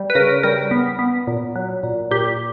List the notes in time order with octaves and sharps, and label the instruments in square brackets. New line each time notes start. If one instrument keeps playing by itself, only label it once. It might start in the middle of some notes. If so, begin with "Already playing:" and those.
Already playing: [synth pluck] G3
B4
C#3 A#4
G3 A#4
B3
B3
A#2
F#3
A#2
A#2 G4